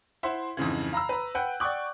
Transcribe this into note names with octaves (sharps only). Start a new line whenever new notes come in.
E4 C5 E5 F#5 C6
F2 G#2 C#3 E3
F5 A#5 B5 E6
B4 A#5
B4 F#5 G5 F#6
D5 F#5 G5 C#6 D6 F#6